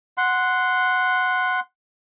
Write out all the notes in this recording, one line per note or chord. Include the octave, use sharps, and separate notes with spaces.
F#5 C6